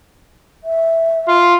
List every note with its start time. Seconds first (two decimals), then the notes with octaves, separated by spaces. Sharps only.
0.64 E5
1.28 F4